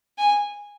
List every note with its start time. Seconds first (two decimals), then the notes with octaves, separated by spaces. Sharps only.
0.18 G#5